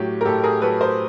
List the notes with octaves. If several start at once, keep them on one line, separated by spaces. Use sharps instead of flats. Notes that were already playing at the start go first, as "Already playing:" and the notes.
Already playing: A2 F#3 G4
A#4
A2 G4 A4
G#4 A#4
F#3 A4 B4
A#4 C5